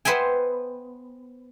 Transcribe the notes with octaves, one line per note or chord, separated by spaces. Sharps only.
B3 C5 E5 G5 G#5